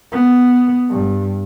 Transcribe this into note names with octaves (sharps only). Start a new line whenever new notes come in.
B3
G2